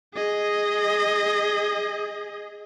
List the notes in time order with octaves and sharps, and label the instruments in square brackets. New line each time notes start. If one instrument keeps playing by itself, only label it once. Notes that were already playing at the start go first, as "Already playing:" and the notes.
[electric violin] G#4 D#5